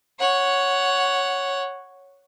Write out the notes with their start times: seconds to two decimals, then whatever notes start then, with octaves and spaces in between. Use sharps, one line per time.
0.20 C#5 F#5